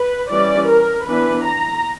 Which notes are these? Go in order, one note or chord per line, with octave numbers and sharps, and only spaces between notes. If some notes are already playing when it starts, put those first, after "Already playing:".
Already playing: B4
E3 G3 C#4 D5
A#4
E3 B3 D4 B4
A#5